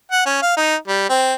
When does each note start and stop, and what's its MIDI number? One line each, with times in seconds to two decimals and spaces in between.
0.11 0.25 78
0.26 0.37 61
0.42 0.53 77
0.57 0.76 63
0.88 1.05 55
1.10 1.34 60